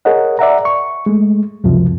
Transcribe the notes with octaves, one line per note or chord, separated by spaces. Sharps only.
G#4 A#4 C#5 D#5 F#5
D5 E5 F#5 A#5
C#6
G#3 A3
C#2 F#2 C3 F3